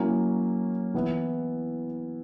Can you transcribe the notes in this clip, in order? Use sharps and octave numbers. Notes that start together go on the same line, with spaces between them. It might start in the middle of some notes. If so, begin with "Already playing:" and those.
Already playing: F#3 A#3 C#4 E4
E3 B3 E4